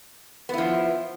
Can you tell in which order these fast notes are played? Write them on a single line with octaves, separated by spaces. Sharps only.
B3 E4 F3